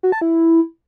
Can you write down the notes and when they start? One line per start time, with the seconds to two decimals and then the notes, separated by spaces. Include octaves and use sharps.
0.03 F#4
0.12 A5
0.21 E4